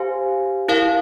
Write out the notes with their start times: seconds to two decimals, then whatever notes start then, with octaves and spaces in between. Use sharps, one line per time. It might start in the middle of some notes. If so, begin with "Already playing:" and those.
Already playing: G4 C5 F5 G#5
0.68 E4 A#4 F5